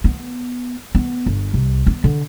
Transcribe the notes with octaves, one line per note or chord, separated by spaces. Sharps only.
B3
B3
G1
C2
B3
D3